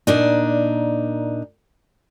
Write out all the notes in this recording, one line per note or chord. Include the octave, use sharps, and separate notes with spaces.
A#2 D4 D#4